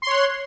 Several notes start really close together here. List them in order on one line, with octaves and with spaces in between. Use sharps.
C6 C#5 F#6